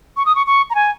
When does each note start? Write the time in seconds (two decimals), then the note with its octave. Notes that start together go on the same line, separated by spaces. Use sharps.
0.17 C#6
0.26 D#6
0.36 C#6
0.47 C#6
0.70 A#5
0.75 G#5